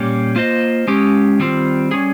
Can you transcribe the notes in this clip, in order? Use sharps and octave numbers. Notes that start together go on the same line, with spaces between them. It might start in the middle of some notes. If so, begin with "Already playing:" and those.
Already playing: A#2 G3 A#3 C#4 G4
A#3 F4 C5 D#5
G#3 C#4 G4
D#3 G3 C4 F4
G3 C#4 G#4